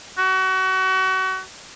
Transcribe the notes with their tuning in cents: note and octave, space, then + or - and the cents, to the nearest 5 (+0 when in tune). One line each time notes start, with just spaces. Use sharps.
F#4 +30